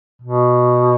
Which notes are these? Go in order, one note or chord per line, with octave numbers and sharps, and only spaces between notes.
B2